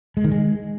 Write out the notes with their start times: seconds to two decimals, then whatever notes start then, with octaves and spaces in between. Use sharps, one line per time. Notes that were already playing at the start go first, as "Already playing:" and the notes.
0.17 G#3
0.24 D#3
0.32 G#3